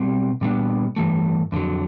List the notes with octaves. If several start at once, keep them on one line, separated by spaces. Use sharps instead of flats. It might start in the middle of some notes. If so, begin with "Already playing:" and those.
Already playing: B2 G3 C4
A#2 G3 B3 D4
G2 E3 A3
F2 D3 F#3